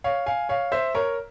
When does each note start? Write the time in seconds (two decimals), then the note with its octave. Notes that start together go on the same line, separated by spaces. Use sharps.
0.04 C#5 F5
0.26 F5 G#5
0.49 C#5 F5
0.72 C5 E5
0.95 A#4 C#5